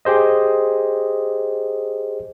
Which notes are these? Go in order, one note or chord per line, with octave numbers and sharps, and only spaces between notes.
G4 G#4 C5 D#5